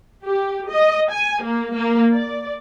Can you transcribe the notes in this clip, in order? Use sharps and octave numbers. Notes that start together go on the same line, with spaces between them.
G4
D#5
G#5
A#3
A#3
D5